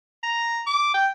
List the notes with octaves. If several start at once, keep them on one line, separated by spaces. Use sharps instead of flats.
A#5
D6
G5